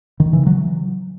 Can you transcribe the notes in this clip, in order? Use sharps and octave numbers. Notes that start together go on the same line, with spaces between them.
D#3
C#3 E3
F#3